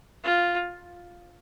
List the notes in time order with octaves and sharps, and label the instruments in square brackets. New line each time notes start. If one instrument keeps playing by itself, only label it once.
[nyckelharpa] F4